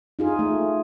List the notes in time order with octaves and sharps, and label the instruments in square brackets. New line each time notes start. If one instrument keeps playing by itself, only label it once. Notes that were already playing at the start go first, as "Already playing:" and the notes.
[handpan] D#4 F4 G#4
A3